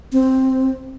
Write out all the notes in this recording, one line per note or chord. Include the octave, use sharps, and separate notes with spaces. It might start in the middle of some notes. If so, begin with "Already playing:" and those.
C4